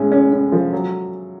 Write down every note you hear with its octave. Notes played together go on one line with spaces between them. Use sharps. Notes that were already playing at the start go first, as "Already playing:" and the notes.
Already playing: A2 G#3 C#4
C#4
C#4
F3
F#3